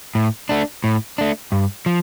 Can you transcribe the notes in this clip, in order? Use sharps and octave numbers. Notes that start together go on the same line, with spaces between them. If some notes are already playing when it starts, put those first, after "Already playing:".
A2
A3 D4
A2
A3 D4
G2
F3